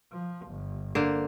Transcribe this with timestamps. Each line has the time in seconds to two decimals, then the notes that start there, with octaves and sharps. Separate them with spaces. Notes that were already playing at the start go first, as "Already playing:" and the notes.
0.12 F3
0.47 G1
0.95 D3 A#3 C5